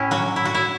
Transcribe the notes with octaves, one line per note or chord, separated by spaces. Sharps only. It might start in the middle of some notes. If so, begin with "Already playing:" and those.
Already playing: A2 C#4 E4
F#3 F#4
E4
F#4
E4